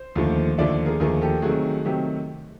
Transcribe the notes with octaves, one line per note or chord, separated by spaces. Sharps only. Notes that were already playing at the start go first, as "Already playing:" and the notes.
Already playing: C5
D#2 D3 F3 A3
D#2 D3 F3 A3 D5 E5
G#4 A#4
D#2 D3 F3 A3 G#4 A#4
G4 A4
C3 D#3 F#3 A3 F#4 G#4
C3 D#3 F#3 A3 G4